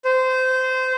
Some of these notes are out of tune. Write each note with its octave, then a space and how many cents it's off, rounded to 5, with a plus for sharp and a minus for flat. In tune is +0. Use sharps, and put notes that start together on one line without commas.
C5 -20